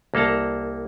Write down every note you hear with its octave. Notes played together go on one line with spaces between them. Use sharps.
C2 A#3 A4 A5 A#5